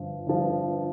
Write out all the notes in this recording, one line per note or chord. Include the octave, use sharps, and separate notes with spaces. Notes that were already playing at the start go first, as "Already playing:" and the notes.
Already playing: G1 G2 F3
G1 G2 F3